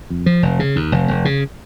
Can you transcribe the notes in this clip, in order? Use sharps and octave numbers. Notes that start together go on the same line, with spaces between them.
F2
F3
F1
C#3
D#2
F1
F1
C#3